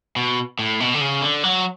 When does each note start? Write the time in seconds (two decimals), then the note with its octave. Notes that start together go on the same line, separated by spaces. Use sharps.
0.16 B2
0.59 A2
0.80 B2
0.94 D3
1.01 C#3
1.22 D3
1.44 F#3